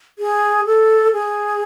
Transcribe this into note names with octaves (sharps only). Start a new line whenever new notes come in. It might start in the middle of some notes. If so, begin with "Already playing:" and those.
G#4
A4
G#4